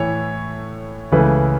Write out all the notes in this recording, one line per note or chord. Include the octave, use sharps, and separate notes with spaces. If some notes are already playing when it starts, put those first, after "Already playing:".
Already playing: A2 E3 A3 C#5
C#2 C#3 E3 A3 B4